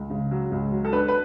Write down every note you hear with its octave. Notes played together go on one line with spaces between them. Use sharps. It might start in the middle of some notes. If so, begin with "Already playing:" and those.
Already playing: C#2
C#3
F#3
C#2
F#3
A4
D4 B4
B4